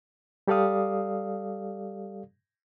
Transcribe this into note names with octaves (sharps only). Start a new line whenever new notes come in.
G3 G4 A4 D5 F5 D#6